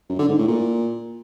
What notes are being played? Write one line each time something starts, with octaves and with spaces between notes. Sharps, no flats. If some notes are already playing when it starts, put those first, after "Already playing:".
F#2
D3
G#2
A2
A#2